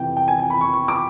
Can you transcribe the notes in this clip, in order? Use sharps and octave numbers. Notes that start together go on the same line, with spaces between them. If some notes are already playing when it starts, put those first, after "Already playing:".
Already playing: F2 C3 E3 G5
G5
G#5
G#5
B5
C#6
C#6
D6